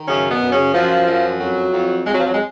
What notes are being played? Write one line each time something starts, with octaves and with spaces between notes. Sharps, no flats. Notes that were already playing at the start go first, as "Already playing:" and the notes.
Already playing: D#3
F#2 C#3 C#4
B2 B3
F#2
C#3 C#4
F#2 F3
F#2
F2 F#3
F2
F2 G#3
F#3
F3
F#3
G#3